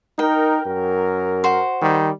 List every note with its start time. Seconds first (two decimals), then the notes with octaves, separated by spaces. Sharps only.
0.19 D#4 A#4 G5
0.65 F#2 A#4
1.44 F#4 C5
1.82 D#3 G3